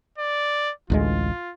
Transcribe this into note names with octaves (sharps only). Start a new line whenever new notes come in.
D5
A1 D2 G#3 F4